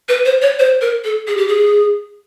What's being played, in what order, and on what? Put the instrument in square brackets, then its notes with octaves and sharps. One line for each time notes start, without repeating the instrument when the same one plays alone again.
[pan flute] B4
C5
C#5
C5
A#4
A4
G#4
G4
G#4